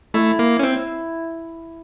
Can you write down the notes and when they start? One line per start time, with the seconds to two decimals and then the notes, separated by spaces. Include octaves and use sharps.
0.14 A3 E4
0.39 A#3
0.59 C#4
0.63 C4